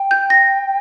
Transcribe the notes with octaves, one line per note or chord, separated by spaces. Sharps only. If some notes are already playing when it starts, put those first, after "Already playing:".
Already playing: G5
G6
A#6